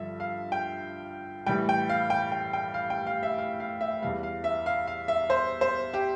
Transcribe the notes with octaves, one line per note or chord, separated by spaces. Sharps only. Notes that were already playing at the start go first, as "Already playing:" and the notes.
Already playing: G2 D3 F3 E5
F5
G5
A2 E3 G3 G5
G5
F5
G5
G5
G5
F5
G5
F5
E5
F5
F5
E5
E2 E3 G3 F5
F5
E5
F5
F5
E5
C5
C5
G4